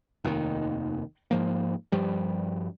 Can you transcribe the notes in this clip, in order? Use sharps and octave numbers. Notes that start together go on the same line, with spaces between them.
F1 D#2 G#2 D#3
G#2 F3 A#3
G2 F3 G3